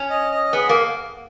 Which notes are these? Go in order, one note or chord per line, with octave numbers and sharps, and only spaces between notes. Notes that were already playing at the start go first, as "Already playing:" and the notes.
Already playing: C#4
D#5
D#5
B3 G#4
A#3